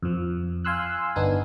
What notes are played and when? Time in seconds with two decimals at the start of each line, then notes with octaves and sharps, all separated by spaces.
0.03 F2 F3
0.65 F5 G#5 C6 E6 F#6
1.16 G1 B3 D4 D#4 G#5